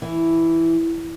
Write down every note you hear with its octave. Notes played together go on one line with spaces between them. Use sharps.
E3